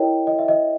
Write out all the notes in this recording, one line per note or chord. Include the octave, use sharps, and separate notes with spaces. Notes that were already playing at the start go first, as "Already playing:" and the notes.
Already playing: E4 G4 A#4 C#5 D#5 G5
D#5
E5
D#5